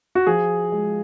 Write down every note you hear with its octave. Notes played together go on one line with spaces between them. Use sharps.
F#4
F3 G#4
G#3